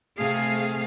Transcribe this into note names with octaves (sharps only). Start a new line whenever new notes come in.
C3 A3 G#4 F5